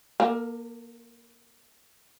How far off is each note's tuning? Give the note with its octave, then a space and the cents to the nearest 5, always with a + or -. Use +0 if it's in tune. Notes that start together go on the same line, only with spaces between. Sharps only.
A#3 +20 A#4 -45